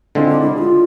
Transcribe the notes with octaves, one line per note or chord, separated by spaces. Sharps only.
D3 G#3 C4 E4 F4
D4
E4
G#4
F4